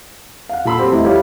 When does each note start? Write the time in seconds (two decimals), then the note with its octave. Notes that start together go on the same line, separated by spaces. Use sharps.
0.49 F5 F#5
0.65 A#2 A4 B5 C6 E6
0.79 F#3 C4 G4
0.92 E2 A3 E4 D#5
1.04 G3 E4 F4 G4 C#5